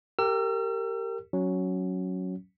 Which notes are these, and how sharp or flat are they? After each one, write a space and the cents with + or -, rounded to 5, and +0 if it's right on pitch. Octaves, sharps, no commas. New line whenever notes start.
G4 +0 A#4 -25 E6 +40
F#3 +0 C#4 +0